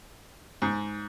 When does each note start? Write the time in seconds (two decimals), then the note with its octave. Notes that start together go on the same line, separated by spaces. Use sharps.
0.62 G#2